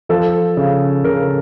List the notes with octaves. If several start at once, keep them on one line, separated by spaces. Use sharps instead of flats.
F3 A4
C#3
C#3 A#4